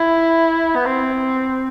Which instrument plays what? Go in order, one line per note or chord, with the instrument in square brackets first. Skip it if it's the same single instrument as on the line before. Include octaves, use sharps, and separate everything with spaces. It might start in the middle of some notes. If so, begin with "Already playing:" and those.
Already playing: [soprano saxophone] E4
B3
C4